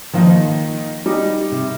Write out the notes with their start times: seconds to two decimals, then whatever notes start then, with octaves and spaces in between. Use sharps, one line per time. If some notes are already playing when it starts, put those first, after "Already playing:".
0.13 D#3 F3 A#3 D#4
1.06 G3 D#4 G4
1.52 C3